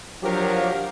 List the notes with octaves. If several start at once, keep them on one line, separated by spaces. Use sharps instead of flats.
F3 F#3 D4 G4 A#4 F5